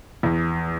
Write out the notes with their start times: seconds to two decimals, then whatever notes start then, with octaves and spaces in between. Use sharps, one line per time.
0.23 E2